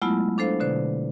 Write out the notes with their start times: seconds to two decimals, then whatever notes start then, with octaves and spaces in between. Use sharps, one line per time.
0.02 F#3 G#3 A3 B3 E4 F4
0.38 D4 A4 C5 F5
0.60 B2 D3 C5